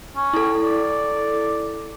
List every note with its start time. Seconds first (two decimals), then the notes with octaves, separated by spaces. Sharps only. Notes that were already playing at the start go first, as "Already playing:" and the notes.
0.16 C#4
0.34 E4 A4
0.64 D5